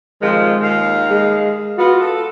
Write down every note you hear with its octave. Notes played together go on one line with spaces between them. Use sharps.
C3 D#3 F3 G#3
D#2 D#3 F5
G#3
B3 F4 F#4
A4